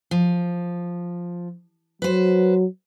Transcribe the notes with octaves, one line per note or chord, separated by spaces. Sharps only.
F3
F#3 B4 C5